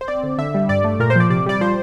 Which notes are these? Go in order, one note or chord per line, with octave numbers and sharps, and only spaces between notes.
C5
C4 D5
D3
D3 E5
G3
G2 D5
A3
A#2 A#4
C5
F3 D5
C3 D5
G3 D5
F3 C5